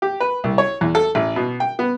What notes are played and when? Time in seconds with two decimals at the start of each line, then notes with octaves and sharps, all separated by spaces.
0.02 G4
0.20 B4
0.44 C2
0.58 C#5
0.81 E2
0.95 A4
1.15 A1
1.36 B2
1.60 G5
1.79 B3